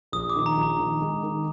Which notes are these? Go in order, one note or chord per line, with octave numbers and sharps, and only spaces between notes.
A#1 D#6
D6
D#3
A#5
A#1
A#5
D#3
G#3
D#3